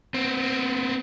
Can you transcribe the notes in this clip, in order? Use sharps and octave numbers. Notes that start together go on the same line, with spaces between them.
B3 C4